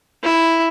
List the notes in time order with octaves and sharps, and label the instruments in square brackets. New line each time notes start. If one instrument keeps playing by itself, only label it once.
[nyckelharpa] E4